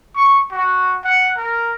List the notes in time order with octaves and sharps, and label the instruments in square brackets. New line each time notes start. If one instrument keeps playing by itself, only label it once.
[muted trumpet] C#6
F#4
F#5
A#4